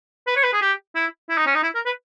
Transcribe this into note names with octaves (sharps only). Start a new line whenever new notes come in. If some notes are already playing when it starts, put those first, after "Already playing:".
B4
C#5
B4
G#4
G4
E4
E4
D#4
C#4
D#4
E4
A#4
B4